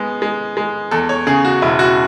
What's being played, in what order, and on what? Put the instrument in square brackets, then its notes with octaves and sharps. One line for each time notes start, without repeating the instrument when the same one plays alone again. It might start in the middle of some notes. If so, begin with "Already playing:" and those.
Already playing: [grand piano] G#3 B3
G#3
G#3
E2 A4
C#5
C#3 G#4
F#4
E1 E4
F#4